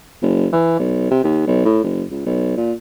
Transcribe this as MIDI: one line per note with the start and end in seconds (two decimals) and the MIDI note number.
0.22 0.47 30
0.53 0.77 52
0.80 1.07 35
1.11 1.21 48
1.24 1.42 39
1.47 1.64 35
1.65 1.83 45
1.84 2.04 30
2.11 2.24 37
2.26 2.57 35
2.57 2.73 46